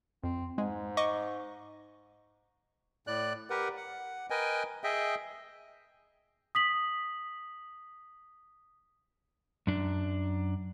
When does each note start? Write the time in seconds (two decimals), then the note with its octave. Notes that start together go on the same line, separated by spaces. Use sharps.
0.24 F2 C4
0.58 G#2 G#3
0.97 D#5 C#6 D6
3.07 A2 D5 F#6
3.50 G4 A#4 B4 F#5
3.77 F#5
4.30 A#4 B4 D#5 G5 G#5
4.84 G#4 D#5 E5 G5
6.55 D#6 B6 F#7
9.67 F#2 D4